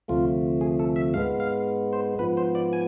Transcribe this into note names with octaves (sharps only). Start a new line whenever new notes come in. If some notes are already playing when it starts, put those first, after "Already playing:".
D2 C3 F3 A3 F4
G#4
A4
E5
G#2 G#3 B3 F5
F5
C5
G#2 F3 B3 B4
C5
D5
G#5